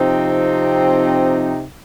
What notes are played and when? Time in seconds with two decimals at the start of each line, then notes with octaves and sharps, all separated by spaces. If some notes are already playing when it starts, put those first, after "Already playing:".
Already playing: C3 F3 C4 D#4